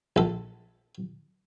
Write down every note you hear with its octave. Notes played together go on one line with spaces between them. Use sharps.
A#1 A4